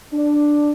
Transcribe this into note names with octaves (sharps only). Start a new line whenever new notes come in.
D4